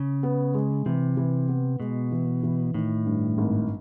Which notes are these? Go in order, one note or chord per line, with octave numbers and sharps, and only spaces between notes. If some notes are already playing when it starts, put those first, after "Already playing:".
Already playing: C#3
B3
G#3
C3 E3
E3
B3
B2 G#3
E3
E3
A2 D#3
G2
G#1